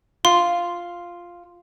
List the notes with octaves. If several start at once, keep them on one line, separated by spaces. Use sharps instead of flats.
F4 C6